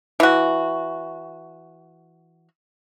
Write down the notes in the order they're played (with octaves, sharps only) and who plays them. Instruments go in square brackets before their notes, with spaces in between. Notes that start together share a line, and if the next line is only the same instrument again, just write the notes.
[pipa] E3 F#4